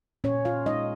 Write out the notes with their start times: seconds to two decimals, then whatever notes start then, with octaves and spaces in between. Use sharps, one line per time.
0.24 A#2 C#4 C#5
0.45 F4 F5
0.66 G#3 C#4 D#4 D#5